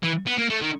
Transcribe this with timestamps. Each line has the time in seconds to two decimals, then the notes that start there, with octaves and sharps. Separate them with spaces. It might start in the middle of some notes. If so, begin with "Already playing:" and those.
0.03 E3
0.27 B3
0.38 A#3
0.50 A3
0.62 D#3